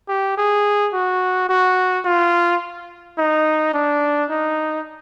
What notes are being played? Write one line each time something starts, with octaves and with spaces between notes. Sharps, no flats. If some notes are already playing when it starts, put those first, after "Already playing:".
G4
G#4
F#4
F#4
F4
D#4
D4
D#4